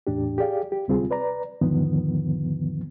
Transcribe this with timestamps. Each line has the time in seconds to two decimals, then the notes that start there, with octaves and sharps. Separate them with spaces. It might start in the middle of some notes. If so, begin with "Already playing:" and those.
0.07 E2 A2 D4 G4
0.38 G4 G#4 D5 F5
0.72 G4
0.88 D2 C3 G3 C4 F4 G#4
1.11 B4 D5 A#5
1.61 E2 G#2 D3 D#3 F3 B3